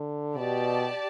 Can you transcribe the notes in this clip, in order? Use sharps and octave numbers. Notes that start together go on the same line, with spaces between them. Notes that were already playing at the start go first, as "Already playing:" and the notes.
Already playing: D3
B2 G4 D5 A5